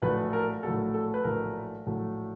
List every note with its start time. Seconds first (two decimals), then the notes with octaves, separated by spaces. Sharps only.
0.02 A#1 A2 F#3 A3 B4
0.33 A#4
0.63 A#1 A2 F#3 A3 A4
0.94 A4
1.14 B4
1.24 A#1 A2 F#3 A3 A#4
1.86 A#1 A2 F#3 A3